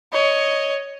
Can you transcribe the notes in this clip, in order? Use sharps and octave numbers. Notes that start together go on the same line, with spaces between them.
C#5 D#5